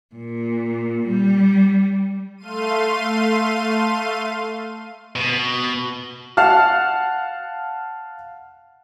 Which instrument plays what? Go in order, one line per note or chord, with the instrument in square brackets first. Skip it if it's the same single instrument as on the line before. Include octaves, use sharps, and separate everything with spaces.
[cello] A#2
G3
[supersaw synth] A3 F5 C6 D#7
[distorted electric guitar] B2
[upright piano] F5 F#5 A5 F6